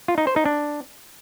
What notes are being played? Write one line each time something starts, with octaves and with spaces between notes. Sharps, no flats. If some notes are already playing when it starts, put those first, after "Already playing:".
F4
D#4
C5
D#4
D4